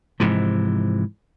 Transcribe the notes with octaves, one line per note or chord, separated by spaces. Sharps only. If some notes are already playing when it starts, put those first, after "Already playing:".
G#2 C3 E3 F3